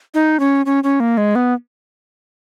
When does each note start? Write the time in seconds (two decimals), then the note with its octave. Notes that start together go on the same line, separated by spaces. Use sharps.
0.14 D#4
0.40 C#4
0.66 C#4
0.84 C#4
1.00 A#3
1.17 G#3
1.35 B3